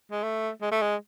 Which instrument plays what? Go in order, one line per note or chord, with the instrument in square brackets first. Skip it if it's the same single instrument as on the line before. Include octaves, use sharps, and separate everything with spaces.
[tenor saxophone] G#3
A3
G#3
A3
G#3